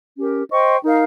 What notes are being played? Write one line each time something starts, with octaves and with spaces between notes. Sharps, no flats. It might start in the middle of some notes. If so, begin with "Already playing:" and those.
C#4 G4 A#4
C5 D#5 G5 C#6
D#4 A#4 F5